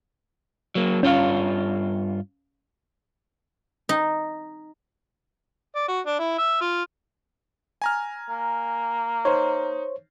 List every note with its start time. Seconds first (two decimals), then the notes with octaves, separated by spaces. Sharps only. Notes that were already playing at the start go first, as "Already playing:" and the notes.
0.75 F#3 A#3
1.03 G2 C#4 F4 C#5 F5
3.89 D#4
5.76 D5
5.88 F#4
6.06 D4
6.19 E4
6.38 E5
6.61 F4
7.82 G#5 A#5 F6
8.29 A#3
9.25 D#4 C5 C#5